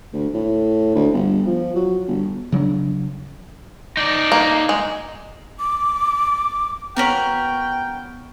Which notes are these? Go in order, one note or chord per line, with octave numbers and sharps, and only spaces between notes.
D2
A2
D2
G1
F3
F#3
G1
C#3 F#3 C#4 D4
D#4 D5
A#3
G#3
D6
B3 C#4 F#4 A#4 G5 F#7